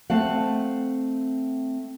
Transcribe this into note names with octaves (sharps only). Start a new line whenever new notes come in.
A3 C4 F5 F#5